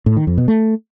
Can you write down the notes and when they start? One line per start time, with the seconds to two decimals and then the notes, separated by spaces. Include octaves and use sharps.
0.06 A2
0.17 D#3
0.27 F2
0.38 B2
0.48 A3